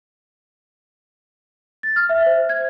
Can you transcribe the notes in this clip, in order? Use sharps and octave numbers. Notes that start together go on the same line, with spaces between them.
A6
F6
E5
C5
G#6